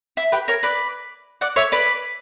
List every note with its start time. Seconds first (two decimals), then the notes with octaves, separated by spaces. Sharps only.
0.17 E4
0.32 G4 B4
0.48 A#4 C#5
0.63 B4 D5
1.41 D5 F#5
1.56 C#5 E5
1.72 B4 D5